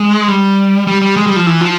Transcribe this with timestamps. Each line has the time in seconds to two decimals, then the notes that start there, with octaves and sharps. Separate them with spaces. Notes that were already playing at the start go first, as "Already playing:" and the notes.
Already playing: G#3
0.28 G3
0.87 G3
1.02 G3
1.17 G#3
1.27 G3
1.36 F3
1.46 E3
1.61 F3